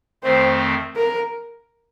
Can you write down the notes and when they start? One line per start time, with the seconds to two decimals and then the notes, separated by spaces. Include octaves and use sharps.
0.23 F2 D#3 A3 C4 C5
0.96 A#4